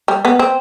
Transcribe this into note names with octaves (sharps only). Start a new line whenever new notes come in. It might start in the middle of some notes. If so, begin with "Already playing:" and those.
G3
B3
C4